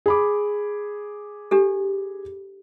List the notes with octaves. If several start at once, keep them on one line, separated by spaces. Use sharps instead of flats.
G#4 B5 D6
D4 G4 A4